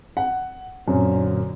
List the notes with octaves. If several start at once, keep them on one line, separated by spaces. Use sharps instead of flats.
F#5
F#2 A#2 D3 C4